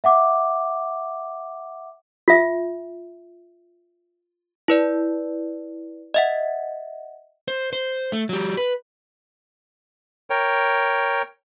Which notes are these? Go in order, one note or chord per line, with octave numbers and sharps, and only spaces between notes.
E5 F#5 D6
F4 E5
E4 B4 D5
D#5 E5 F#5
C5
C5
A3
F#3 G4
B4
A#4 C#5 G5